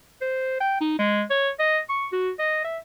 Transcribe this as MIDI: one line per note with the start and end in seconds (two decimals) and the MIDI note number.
0.22 0.56 72
0.60 0.76 79
0.81 0.95 63
0.99 1.23 56
1.30 1.50 73
1.60 1.79 75
1.89 2.07 85
2.13 2.30 66
2.39 2.61 75
2.64 2.78 76